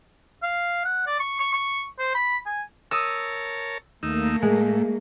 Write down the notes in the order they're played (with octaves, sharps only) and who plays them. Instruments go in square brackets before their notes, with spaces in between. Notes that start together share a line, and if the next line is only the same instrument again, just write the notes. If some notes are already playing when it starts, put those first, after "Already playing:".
[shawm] F5
F#5
D5
C#6
C#6
C#6
C5
B5
G#5
[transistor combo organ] A#4 C#5 A5 [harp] D#6 E6
[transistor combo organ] D#2 D#4 E6 [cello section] A3 A#3
[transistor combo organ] A2 [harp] G#3